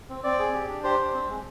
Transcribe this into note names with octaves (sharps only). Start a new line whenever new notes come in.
C4
C4 D5
G#4
G4
D4
G4 C5
D4
C4
G#3